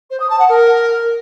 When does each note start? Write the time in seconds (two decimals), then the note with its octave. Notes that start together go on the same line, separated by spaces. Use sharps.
0.10 C5
0.20 D#6
0.29 A5
0.39 F#5
0.49 A#4